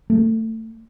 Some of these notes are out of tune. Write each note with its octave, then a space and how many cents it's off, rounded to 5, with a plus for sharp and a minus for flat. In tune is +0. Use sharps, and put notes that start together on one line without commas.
A3 +25